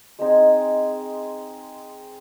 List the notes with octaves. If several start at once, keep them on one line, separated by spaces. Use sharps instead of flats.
G#3 C4 D#4 G#4